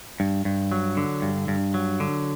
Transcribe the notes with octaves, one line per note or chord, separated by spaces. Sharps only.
G2
G2
F#3
D3
G2
G2
F#3
D3